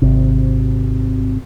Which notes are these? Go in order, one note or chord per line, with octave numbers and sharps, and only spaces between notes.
G#1 C3